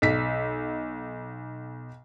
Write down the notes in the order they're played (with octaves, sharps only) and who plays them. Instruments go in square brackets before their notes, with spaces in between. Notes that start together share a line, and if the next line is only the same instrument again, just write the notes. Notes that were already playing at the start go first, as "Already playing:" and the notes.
[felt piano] B1 B6